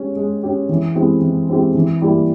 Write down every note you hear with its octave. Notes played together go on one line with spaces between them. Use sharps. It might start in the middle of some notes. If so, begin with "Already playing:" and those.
Already playing: G#3 C#4 G4
G#3
C#4 G4
E3
G#3 C4 E4 G4
E3
G#3 C4 E4 G4
E3
G3 A#3 E4 G4